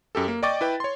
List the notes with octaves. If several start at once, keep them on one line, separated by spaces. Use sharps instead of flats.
F#2 G4 A4
A#3
D5 D#5 G5 C#6 D6 A6
E4 B4 G5
C#5 C6